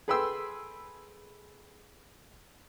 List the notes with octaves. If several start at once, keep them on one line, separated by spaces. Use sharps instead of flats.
G#4 A4 B4 G5 C6 E6